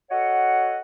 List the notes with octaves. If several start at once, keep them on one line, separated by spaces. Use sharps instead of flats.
F#4 A4 C#5 D#5 F#5